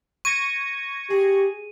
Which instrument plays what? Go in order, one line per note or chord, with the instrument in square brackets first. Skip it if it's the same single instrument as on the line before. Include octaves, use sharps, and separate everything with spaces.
[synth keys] C#6 G#6 A#6 [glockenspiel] D#7
[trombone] G4 [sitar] G#4